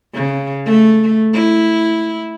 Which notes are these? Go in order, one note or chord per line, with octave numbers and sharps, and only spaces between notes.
C#3
A3
E4